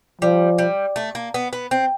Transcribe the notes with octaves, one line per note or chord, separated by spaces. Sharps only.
F3 G3
G3
A3
A#3
B3
B3
C4